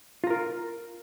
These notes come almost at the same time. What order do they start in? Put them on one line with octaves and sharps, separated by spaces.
F4 A#5 A#4